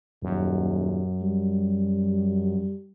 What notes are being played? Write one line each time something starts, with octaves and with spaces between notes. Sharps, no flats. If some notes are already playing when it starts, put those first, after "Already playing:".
D#1 F#2
G3